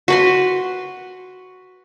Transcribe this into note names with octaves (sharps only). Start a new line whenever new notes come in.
F#4 B4 C6